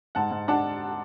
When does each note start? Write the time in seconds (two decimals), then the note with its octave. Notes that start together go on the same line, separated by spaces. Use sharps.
0.15 G#2 F#5 A5
0.31 G#2
0.48 D4 F#5 A5